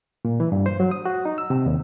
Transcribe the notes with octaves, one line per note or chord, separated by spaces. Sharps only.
A#2
E3
G2
C5
F#3
D#6
F#4
D#4
E6
C3
D#2